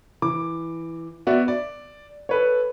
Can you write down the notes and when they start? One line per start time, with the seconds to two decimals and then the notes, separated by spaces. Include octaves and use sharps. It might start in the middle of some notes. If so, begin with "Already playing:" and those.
0.22 E3 D6
1.27 B3 F#4 D5 E5
1.48 D5
2.29 A4 B4 C#5